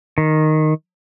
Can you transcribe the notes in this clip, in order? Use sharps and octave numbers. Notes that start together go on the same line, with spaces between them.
D#3